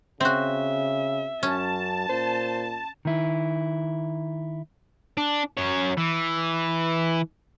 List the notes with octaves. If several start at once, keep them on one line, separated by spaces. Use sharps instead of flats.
C#3 C4 F#4 E5
F#2 C#4 A5
A#2 C5
D#3 E4
D4
F#2 C#5
E3